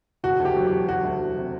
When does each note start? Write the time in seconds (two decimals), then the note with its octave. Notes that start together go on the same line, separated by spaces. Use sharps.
0.23 E1 F#4
0.40 D2
0.45 G4
0.56 F#3
0.67 E1 G4
0.88 F#3 F#4
1.04 D2
1.20 F#3
1.36 C3